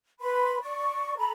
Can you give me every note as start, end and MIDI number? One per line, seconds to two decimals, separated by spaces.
0.20 0.58 71
0.20 0.58 83
0.20 0.58 84
0.62 1.16 74
0.62 1.16 85
1.17 1.31 69
1.17 1.31 82
1.17 1.31 83